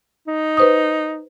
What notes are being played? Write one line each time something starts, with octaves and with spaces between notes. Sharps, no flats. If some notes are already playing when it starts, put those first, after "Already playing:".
D#4
B4 C5 D#6